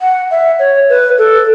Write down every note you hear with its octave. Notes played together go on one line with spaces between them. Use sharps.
F#5
E5
C#5
B4
A4